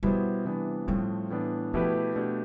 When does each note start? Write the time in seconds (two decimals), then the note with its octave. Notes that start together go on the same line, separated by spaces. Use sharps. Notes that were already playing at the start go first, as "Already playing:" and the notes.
0.03 B2 G3 B3 E4 G4 C5
0.45 C3 E3 B3 D4
0.87 A2 F3 G3 A3 C4
1.30 A2 E3 B3 D4
1.73 B2 F3 A3 E4 G4 B4
2.16 B2 A3 D4 G4